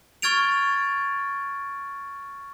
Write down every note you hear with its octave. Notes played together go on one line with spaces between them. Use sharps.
C#6 F6 G#6 A6 D7 F7